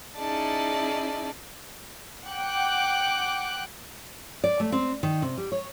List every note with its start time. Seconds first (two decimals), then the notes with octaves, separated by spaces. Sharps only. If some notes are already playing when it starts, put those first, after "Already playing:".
0.16 C#4 D#4 E4 G#4 D5 A5
2.28 F#5 G5 D6 F#6
4.44 D5
4.60 A3
4.72 C4
5.03 D#3
5.22 C3
5.37 G3
5.52 C#5